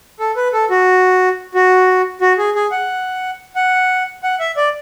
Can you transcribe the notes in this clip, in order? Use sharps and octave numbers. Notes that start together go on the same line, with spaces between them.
A4
B4
A4
F#4
F#4
F#4
G#4
G#4
F#5
F#5
F#5
E5
D5